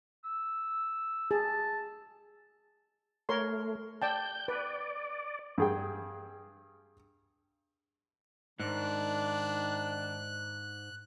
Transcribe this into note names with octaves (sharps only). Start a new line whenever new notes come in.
E6
G#4 A5
A3 A#4 C#5 C6
D5 G5 A5 G6
B4 D5
G2 G#4 G5
G#2 D#3 D4 F#6